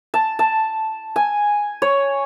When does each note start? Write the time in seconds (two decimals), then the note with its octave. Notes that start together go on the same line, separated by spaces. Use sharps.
0.14 A5
0.39 A5
1.16 G#5
1.82 C#5